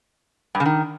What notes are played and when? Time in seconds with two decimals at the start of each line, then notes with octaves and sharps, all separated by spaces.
0.55 G2
0.60 C#3
0.66 D#3